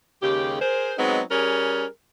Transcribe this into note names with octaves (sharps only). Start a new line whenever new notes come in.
D#2 C#3 G#3 G4
G#4 A#4 C5
F#3 G#3 B3 C4 D#4
G3 C#4 G#4 A#4